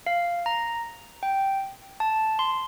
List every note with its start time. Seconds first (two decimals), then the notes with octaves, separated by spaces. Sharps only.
0.06 F5
0.46 A#5
1.23 G5
2.00 A5
2.39 C6